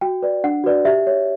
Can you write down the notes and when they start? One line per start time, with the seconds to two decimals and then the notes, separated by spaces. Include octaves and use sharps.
0.01 F#4 G5
0.22 B4 D5
0.44 D4 F#5
0.64 F#4 B4 D5
0.85 G4 E5
1.07 C#5